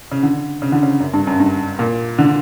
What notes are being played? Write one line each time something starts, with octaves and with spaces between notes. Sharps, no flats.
C#3
D3
C#3
D3
C#3
F#2
G2
F#2
G2
A#2
D3